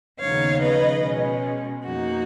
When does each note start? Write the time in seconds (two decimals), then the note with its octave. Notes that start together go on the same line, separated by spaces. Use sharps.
0.20 D#2 C#3 F3 B3 D#4 C#5 F5
0.61 B4 D#5
1.02 B2 G#3 C#4
1.83 F2 F3 A#3 D#4 F#4